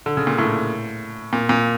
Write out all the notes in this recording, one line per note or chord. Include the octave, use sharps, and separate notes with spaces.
D3
C#3
A#2
A2
A#2
A#2